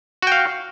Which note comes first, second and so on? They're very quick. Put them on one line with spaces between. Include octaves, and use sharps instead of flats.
F#4 G5 F5